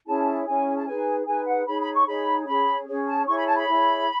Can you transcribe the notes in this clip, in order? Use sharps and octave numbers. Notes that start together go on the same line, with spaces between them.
C#4 E4 G#4 C#5 A5
C#4 E4 G#4 C#5 G#5
A5
D#4 G#4 B4 G#5
D#4 G#4 B4 G#5
F#5
D#4 G#4 C#5 B5
B5
C#6
D#4 G#4 C#5 B5
C#4 G#4 C#5 B5
C#4 G#4 C#5
A5
E4 G#4 C#5 C#6
B5
A5
B5
E4 G#4 C#5